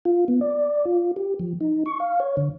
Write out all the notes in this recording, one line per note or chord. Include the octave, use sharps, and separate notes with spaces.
F4
B3
D5
F4
G4
F3
D#4
C#6
F5
C#5
D3